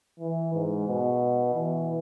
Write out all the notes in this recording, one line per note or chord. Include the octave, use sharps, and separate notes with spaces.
E3
G#2
B2
E3